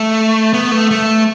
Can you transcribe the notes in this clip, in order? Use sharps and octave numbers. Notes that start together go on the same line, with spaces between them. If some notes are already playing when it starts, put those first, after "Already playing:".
Already playing: A3
B3
A3
A3